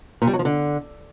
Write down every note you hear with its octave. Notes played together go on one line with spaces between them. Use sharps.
A#2
G3
F#3
F3
D3